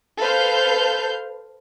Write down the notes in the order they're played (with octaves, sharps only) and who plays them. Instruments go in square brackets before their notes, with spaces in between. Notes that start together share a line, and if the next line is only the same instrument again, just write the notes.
[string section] A4 B4 C5 F5 G6